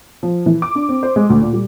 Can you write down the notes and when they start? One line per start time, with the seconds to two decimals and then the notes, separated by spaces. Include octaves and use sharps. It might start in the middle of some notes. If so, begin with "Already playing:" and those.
0.23 F3
0.46 E3
0.62 D6
0.75 D4
0.89 C4
1.03 C5
1.16 G#3
1.30 D2
1.41 A#2
1.53 G3